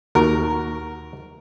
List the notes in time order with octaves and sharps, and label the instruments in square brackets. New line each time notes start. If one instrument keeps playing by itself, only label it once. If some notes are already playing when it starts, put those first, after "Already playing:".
[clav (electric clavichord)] D#2 F#4 [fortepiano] A#4